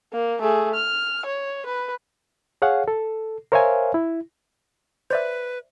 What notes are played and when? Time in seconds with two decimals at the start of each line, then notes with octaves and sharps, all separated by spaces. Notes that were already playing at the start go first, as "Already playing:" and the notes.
0.13 A#3
0.41 A3 G#4
0.74 F6
1.26 C#5
1.66 B4
2.62 G#4 C#5 F5 F#5
2.88 A4
3.52 A#4 C5 C#5 E5 F5 G#5
3.94 E4
5.10 B4 C5 D5 E5